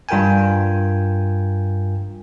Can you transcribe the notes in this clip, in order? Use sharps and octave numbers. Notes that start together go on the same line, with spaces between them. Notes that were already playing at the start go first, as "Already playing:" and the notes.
G2 F4 A#4 G5 G#5